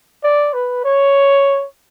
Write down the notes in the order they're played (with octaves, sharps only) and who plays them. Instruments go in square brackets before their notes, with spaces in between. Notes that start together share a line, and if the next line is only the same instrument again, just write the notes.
[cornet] D5
B4
C#5